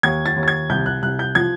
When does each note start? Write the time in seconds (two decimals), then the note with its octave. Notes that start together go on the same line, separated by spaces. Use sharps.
0.03 D#2 G#6
0.26 A6
0.36 D#2
0.43 A6
0.48 G#6
0.69 C2 G6
0.86 F#6
1.03 C2 F#6
1.19 G6
1.35 F3 G#6